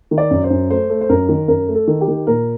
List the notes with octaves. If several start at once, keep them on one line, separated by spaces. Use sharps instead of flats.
D#3
D5
F#2
C5
F#2
A3 C5
A3
C5
F#2 A#4
D#3
F#2 A#4
A3
A4
D#3
G4
D#3
A#2 A#4